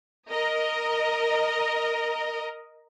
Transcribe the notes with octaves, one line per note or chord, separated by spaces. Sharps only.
A#4 D#5